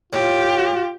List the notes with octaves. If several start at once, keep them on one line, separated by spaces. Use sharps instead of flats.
A2 F4 G4